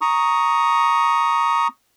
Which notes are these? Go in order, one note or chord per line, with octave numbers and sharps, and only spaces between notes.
A#5 C#6 D#6